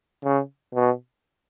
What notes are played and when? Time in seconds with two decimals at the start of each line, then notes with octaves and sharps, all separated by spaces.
0.24 C#3
0.75 B2